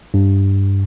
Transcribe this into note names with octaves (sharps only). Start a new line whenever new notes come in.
G2